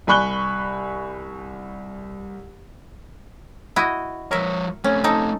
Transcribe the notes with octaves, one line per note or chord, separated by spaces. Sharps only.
C2 G#5 B5 C#6 F#6 G7
E4 F#4 D#5
F3 A#4 C#5 E5
A3 C4 C#4
D#4 A4